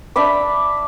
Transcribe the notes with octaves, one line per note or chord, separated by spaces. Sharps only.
D4 E5 B5 D6